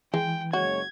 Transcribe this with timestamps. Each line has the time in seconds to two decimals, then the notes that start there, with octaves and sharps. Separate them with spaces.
0.14 E3 G#3 G5
0.53 F#1 G#3 F#4 C#5 G#6